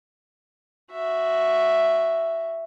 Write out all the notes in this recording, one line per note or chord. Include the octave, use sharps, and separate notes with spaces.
F#4 E5